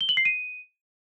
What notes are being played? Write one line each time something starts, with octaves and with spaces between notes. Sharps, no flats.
G7
F#7
C7
D#7